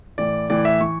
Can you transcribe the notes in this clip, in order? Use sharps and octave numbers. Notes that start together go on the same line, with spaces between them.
A2 E3 D5
A2 E3 D5
E5
E3 C#6